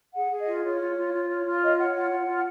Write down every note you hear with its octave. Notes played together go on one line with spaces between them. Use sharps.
G#4 F#5
G#4
D#5
F4
F4 C#5
F4
F4
F4
C#5
F4
C#5 D#5
C#5 F#5
F4 F#5
F4
F4